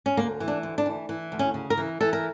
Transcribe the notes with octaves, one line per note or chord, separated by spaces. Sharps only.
C#4
D2 A#3
E3
D4
D2
D4
E3
E3
D2
C#4
C#3
A#4
E3
E3 A4
A#4